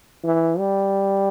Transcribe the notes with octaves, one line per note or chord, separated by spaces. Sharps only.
E3
G3